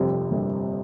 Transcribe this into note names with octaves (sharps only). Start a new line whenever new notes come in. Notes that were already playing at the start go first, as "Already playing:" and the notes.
Already playing: G1 F2 C3 G3 C4
G1